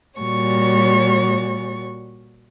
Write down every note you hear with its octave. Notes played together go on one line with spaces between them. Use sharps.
A#2 G3 F#4 C#5 C#6